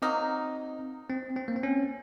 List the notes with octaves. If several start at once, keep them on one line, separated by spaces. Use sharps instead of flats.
F#3 A#3 C4 D#4
C4
C4
A#3
C4
C#4